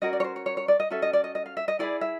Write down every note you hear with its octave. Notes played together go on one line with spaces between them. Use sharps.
C#4 F#4 A#4 D#5
D5
C#5
C5
C#5
C#5
C#5
D5
D#5
C#4 F#4 A4 E5
D#5
D5
D#5
D#5
F5
E5
D#5
E4 G#4 B4 D5
E5